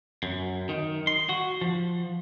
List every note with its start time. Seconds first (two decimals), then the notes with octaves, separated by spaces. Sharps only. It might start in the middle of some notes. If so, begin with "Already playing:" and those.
0.23 F#2
0.69 D#3
1.07 C6
1.29 F#4
1.61 F3